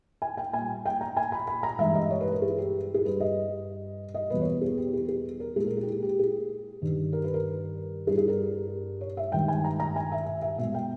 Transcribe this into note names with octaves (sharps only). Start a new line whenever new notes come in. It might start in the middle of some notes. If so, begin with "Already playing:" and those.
G#5
G5
A#2 G3 G#5
G5
A#5
G#5
B5
B5
A#5
G2 E3 G#3 E5
D#5
C#5
B4
A#4
G#4
G4
G#4
G2 G3 B4
D#5
D#5
E2 B2 G3 B4
C#5
B4
G#4
G4
G#4
G#4
A#4
A#2 G#3 G#4
A#4
G#4
G4
G#4
G4
G#4
G2 D#3 G3
A#4
B4
A#4
G2 G3 G#4
G#4
A#4
C#5
E5
G2 D#3 G#3 G5
G#5
A#5
A#5
G#5
E5
E5
E5
B2 G#3 E5
G5